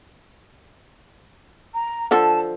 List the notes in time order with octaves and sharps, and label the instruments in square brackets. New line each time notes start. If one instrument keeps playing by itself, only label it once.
[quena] A#5
[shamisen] D3 F3 A4 [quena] A5